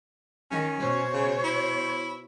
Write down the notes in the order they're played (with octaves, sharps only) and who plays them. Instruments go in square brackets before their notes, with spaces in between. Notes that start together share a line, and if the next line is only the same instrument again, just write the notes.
[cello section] D#3 [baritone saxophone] C#4
[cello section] B2 C5 C#5
[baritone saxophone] C#3
E4